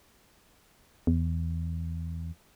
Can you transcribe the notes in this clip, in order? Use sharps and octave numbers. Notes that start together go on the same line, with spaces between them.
E2